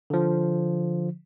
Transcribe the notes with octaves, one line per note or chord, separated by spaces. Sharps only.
D3 F3